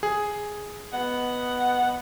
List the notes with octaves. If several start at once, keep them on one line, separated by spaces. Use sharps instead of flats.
G#4
B3 D#5 F#5